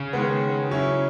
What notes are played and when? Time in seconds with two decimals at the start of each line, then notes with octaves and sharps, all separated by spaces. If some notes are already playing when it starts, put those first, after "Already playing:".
Already playing: C#3
0.13 D#3 G#3 B3
0.70 F#3 C#4 E4